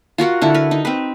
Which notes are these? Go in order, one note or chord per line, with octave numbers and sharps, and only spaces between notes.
F4 F#4 A#4 F#5
D3 E4 C#6
A#4 B4
D#4
C4 B4